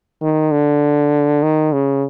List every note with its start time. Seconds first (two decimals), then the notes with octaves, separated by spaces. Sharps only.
0.22 D#3
0.51 D3
1.43 D#3
1.73 C#3